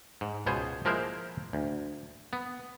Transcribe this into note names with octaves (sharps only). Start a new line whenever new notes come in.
G#2
C#2 B2 B3 G#4 C5
F3 G#3 A#3 E4 A#4 C5
D2
B3